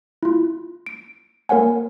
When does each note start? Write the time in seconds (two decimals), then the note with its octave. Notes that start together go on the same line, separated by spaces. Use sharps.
0.23 E4 F4
0.86 D7
1.49 A#3 A#4 C#5 F#5 G#5